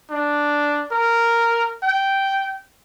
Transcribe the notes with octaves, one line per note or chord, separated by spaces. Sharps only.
D4
A#4
G5